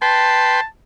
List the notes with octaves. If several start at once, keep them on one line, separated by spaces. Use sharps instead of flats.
B4 G5 A5 C6